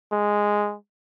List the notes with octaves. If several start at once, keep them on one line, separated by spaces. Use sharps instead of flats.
G#3